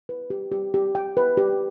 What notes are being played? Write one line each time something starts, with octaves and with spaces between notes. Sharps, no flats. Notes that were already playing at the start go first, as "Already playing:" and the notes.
B4
G4
G4
G4
G5
B4
G4